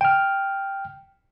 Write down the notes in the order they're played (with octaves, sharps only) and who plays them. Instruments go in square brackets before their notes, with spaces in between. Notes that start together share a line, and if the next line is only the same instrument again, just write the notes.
[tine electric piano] G5 F6